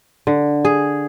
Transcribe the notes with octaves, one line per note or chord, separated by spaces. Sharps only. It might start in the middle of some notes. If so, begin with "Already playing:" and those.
D3
G#4